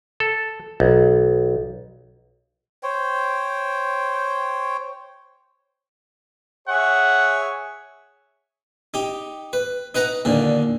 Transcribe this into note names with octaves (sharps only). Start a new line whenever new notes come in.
A4
B1
C5 C#5 G5
G#4 C#5 E5 F#5
D#4 G4
B4
D#4 B4 F#5 A#5
D#2 A#2 D3